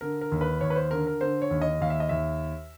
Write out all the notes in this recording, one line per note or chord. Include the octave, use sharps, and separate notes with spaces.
D3 A#4
A#4
D#2
B4
D#2 C#5
B4
C5
D3 A#4
A#4
D3 C5
C#5
D#2
D#5
D#2 F5
E5
D#5
D#2 E5